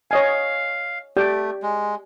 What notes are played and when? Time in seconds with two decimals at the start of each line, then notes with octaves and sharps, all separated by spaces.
0.11 C#5 D#5 F5 G#5
1.17 A3 G4 D5 G5
1.62 G#3